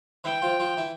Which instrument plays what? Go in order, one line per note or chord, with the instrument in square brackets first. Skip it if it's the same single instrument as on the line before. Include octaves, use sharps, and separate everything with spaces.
[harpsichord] E3 E4 [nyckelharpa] G5
[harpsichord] F3 F4
F3 F4
E3 E4